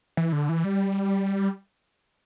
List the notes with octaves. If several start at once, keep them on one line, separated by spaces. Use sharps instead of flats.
E3
D3
E3
G3